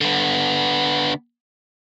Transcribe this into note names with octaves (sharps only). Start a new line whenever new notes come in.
D3 B3